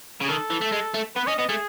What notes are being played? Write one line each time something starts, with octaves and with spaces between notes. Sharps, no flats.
C#3 G#4
D#3 A4
E3
A3
G#3
A3
B3 B4
C#4 D#5
B3 D#5
A3 G#4